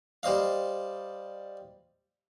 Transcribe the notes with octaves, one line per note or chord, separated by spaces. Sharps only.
G3 C5 D#5 F5